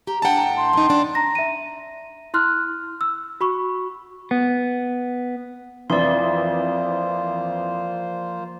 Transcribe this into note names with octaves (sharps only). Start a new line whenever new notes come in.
G4 A#5
A2 D4 F#5 G5 A5
A#5
C6
F#2 D#4
E2 D4
A#5 A#6
E5 D#7
E4 C6 F6 F#6
E6
F#4 B5 C#6
B3
F2 E3 F3 A#3 F4 C5 D5 C6